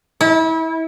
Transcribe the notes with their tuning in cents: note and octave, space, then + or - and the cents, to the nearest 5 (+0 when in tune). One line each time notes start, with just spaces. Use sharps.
E4 -30